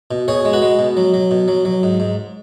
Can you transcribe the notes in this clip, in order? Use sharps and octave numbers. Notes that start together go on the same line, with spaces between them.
B2
B2 G#4 C#5
G#3
F#4 B4
G#3
B2
F#3
F#3
B2
F#3
F#3
G#2
G#2